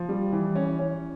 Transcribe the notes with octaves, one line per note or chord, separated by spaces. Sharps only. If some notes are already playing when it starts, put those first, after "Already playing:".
Already playing: F3
G3
E3
C#4
C#4